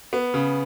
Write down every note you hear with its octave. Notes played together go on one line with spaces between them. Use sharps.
B3
C#3